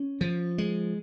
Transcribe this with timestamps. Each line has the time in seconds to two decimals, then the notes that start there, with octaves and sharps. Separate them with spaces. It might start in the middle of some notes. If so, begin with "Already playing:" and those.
Already playing: C#4
0.21 F3
0.58 G#3